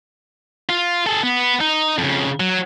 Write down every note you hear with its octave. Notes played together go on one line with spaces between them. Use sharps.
F4
G#4 A4
B3
D#4
F2 C#3
F#3